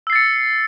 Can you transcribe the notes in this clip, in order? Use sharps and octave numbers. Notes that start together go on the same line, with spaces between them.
E6 A6 C7 C#7